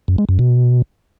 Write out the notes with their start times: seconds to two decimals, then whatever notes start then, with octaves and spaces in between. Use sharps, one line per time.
0.08 F#2
0.18 G#3
0.29 F#2
0.39 B2